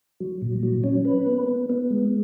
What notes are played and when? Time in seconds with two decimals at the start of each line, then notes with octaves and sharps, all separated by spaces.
0.20 F#3
0.42 A#2
0.63 F#3
0.84 C#4
1.05 B4
1.27 B3
1.48 B3
1.70 B3
1.90 G#3